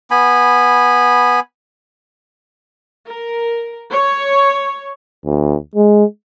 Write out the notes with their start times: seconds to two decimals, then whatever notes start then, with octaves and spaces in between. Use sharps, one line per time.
0.11 B3 G#5 B5
3.07 A#4
3.90 C#5
5.25 D2
5.75 G#3